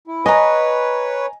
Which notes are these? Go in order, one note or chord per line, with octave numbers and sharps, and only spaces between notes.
E4
B4 C#5 D#5 G#5 A#5